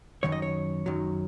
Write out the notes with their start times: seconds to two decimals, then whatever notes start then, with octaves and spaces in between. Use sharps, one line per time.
0.23 F#2 D#3 F#3 C#5
0.32 D#5
0.42 C#5
0.86 F#2 D#3 F#3